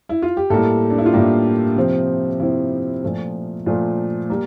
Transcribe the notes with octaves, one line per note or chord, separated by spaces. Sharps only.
E4
F4
G4
A2 G3 A#3 A4
D4
E4
F4
A2 G3 A#3 G4
C3 F3 C4
C3 F3 C4 E4
A#2 F3 A3
A#2 F3 A3 F4
G3 A#3